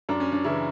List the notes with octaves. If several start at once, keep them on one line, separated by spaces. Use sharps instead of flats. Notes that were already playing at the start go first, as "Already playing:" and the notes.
F#2 D4
C#4
D4
C#3 E3 E4